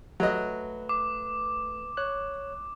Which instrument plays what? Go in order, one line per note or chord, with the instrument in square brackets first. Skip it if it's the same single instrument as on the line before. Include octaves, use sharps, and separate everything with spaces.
[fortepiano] F#3 D#5 [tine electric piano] A3 B4
[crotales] D6
[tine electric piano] C#5 F#6